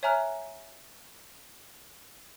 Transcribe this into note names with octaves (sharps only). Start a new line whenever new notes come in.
C#5 E5 G#5 A#5 F6 F#6